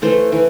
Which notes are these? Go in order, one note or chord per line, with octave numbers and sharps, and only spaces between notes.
E3 A3 A4 C5
E3